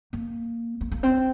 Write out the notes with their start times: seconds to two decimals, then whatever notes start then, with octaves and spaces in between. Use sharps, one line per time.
0.13 A#3
0.81 A#3
0.92 A#3
1.03 C4